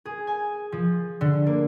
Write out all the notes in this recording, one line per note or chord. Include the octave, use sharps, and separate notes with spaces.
G#4
G#5
F3
D3
A#3